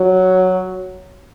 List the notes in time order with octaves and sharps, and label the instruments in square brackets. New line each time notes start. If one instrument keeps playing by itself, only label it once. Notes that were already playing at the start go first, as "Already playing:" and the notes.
Already playing: [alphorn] F#3